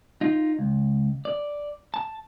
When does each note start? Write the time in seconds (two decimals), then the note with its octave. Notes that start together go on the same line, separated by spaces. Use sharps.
0.21 D#4 F4
0.59 C#2
1.25 D5
1.94 A5